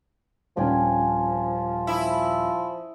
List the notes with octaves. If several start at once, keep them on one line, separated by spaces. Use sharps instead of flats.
D#1 F3 C#4 D4 G5 G#5
E4 D#6